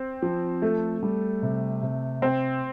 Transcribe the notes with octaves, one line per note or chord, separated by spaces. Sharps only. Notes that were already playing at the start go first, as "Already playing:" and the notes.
Already playing: C4
F3
A3 A4
G3
C3
C3
C4 C5